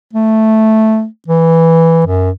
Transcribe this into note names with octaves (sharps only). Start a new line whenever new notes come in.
A3
E3
F#2